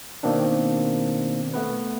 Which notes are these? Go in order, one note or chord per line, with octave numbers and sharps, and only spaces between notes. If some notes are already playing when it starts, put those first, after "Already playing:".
B2 D#3 A#3 C4 D4
A3 B3 B4